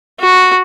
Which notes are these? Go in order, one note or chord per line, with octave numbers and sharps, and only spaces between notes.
F#4